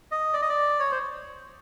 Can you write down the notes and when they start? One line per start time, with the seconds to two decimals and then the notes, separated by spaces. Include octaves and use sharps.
0.11 D#5
0.33 D5
0.42 D#5
0.49 D5
0.80 C#5
0.91 C5